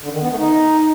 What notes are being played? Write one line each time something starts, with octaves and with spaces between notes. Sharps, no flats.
D3
D#3
B3
A3
D#4